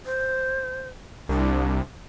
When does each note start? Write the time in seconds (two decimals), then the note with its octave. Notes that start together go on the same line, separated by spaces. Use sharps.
0.06 C5
1.29 C2 D4